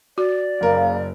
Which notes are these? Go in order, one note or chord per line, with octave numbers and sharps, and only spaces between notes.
F#4 D5
F#1 C#3 A#3 A#4